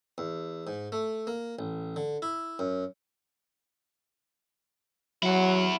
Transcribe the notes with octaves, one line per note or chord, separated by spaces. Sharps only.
E2
G#2
A3
A#3
A1
D3
E4
F#2
F#3 E4 F#5